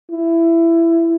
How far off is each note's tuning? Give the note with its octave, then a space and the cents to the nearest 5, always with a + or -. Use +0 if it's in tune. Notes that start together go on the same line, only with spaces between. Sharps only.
E4 +15